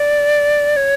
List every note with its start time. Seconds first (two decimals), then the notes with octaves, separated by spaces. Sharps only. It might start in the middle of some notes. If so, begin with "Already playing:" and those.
Already playing: D5
0.76 C#5